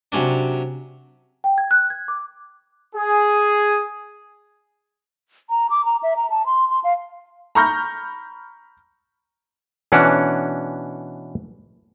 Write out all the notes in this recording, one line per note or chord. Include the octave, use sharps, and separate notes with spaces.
C3 F#3 C#4 D4
G5
G#6
F#6
G#6
D6
G#4
A#5
D6
A#5
E5
A#5
A5
C6
C6
F5
A#5 B5 C#6 F6 G6 A#6
B2 E3 C#4 D4 F#5